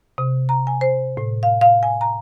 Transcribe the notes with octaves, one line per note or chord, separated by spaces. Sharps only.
C3
A#5
G#5
C5
A2
F5
F5
G#5
A#5